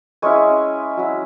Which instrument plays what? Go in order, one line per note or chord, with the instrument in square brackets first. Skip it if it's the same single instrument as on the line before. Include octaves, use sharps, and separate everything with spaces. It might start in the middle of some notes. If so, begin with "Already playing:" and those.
[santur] G#3 C#4 E4 G#5 C#6
F#3 C#4 E4